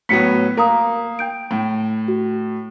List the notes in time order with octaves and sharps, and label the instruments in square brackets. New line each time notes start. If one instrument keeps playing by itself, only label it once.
[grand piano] A2 F#3 B3 [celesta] B6 C#7
[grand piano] A#3 [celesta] A#4 A#5 D#6
[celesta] G5 G6 D7
[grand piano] A2
[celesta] F#4